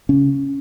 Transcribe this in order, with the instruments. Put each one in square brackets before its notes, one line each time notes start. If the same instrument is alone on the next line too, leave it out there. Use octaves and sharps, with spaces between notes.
[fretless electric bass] C#3 C#4